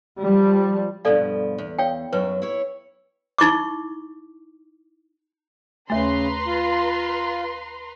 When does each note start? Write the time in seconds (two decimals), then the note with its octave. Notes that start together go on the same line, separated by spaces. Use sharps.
0.20 F3 G3
1.05 G2 B2 F3 A4 D5 F5
1.58 E2
1.78 C#5 F5 G5
2.12 F#2 F#3 B4
2.42 E4 C#5
3.38 D#4 E4 C#6 D6
5.90 D#2 C#3 A3 B4 A#5 C6
6.47 F4